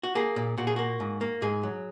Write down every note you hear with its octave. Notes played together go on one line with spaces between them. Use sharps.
F#4
A#3 G#4
A#2
A#2 F#4
G#4
A#3 F#4
G#2
A#3
G#2 G#4
F#3